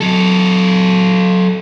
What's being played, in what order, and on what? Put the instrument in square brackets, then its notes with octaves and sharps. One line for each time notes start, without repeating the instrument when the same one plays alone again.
[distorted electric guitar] F#3 A4